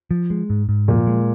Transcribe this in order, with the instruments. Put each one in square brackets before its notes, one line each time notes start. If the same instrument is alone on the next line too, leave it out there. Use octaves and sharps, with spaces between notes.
[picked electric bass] F3
G#3
G#2
G#2
[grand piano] A#2 [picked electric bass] F3
[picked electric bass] G#3